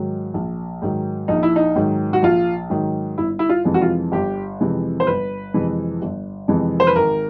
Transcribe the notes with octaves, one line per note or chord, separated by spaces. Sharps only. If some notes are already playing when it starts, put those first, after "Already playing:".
Already playing: G#2 D#3 F#3
A#1
G#2 D#3 F#3
A#1 D#4
E4
D#4
G#2 D#3 F#3
F#4
A#1 F4
G#2 D#3 F#3
G1 E4
E4
F4
F2 C3 E3 G#3
F#4
F4
G1 G4
F2 C3 E3 G#3
C5
G1 B4
F2 C3 E3 G#3
G1
F2 C3 E3 G#3
C5
B4
G#1 A#4